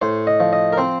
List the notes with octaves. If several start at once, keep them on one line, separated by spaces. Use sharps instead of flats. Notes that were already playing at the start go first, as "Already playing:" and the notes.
A2 C5
D#5
F3
D#5
A#4
C4 C5